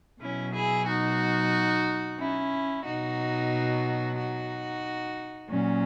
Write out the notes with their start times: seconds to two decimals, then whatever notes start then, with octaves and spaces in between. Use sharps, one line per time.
0.21 B2 F#3 C#4 E4
0.54 E4 G#4
0.87 D#4 F#4
2.19 C#4 E4
2.85 B2 F#3 D#4 F#4
4.17 D#4 F#4
5.49 A#2 F#3 C#4